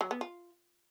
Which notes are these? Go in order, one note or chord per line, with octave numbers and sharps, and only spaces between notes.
F#3
B3
F4